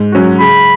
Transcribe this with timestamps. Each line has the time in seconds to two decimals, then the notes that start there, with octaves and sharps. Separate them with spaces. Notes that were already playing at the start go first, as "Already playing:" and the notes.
Already playing: G#2
0.12 F#3 C#4 F#4
0.40 C#3 B5